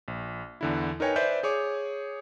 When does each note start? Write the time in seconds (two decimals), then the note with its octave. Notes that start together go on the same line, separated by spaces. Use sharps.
0.08 A#1
0.61 E2 D3 E4
1.00 D#4 A#4 B4 C#5 G5 G#5
1.16 B4 C5 D5 E5 G6
1.43 G#4 C#5 D6